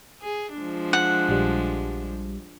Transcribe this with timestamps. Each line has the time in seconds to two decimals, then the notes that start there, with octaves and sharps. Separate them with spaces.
0.22 G#4
0.57 F3 G#3 D4
0.93 F#5
1.29 A#1 G3